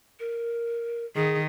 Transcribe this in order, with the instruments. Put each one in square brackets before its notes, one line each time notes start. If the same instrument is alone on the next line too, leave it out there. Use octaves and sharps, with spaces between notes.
[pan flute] A#4
[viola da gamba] D#3 [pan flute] G#4